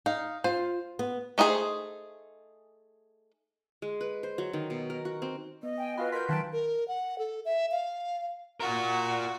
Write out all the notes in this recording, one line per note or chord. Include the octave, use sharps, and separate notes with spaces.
D#4 F5
F4 C5
B3
A3 D#4 F4 G#4 C5
G#3
B4
C5
F#3
D#3
B2
A#4
F#4
C4
B3 D#5
G5 G#5
F4 F#4 B4 F5 G#5 B5
A#4 C6 G6 B6
D#3 F#3 F5 A5 F#6 D7
A#4
F#5
A4
E5
F5
F4 F#4 A#4